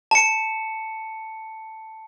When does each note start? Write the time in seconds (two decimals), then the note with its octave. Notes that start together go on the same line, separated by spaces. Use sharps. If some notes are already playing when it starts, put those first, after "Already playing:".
0.11 A5 C#7